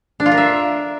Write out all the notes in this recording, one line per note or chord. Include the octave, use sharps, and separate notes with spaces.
D4
F4
A#4
E5